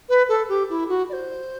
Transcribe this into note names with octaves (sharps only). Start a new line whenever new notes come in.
B4
A4
G4
E4
F#4
D5
C5